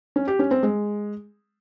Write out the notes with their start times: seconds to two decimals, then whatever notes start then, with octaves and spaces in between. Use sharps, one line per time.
0.16 C#4
0.28 G4
0.39 C#4
0.51 C4
0.63 G#3